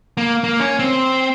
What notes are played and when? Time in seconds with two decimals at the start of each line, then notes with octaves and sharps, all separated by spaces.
0.17 A#3
0.44 A#3
0.60 C#4
0.79 C4